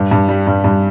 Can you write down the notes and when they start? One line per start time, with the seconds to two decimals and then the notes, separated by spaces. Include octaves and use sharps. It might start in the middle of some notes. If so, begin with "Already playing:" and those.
Already playing: G2
0.11 G2
0.29 G3
0.47 G2
0.64 G2